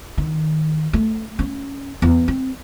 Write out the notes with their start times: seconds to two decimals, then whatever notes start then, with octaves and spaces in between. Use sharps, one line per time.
0.18 D#3
0.93 A3
1.39 C#4
2.02 E2
2.28 C4